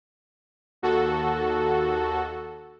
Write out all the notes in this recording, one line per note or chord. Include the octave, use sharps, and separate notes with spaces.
D#2 F#4 A4